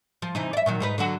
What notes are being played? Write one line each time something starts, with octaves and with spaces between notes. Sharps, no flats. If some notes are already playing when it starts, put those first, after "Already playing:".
F3
C3 E3 D#4
D5 E5
A#2 D#3 F#3
G#2 D#4 B4
D3 F#3 F#4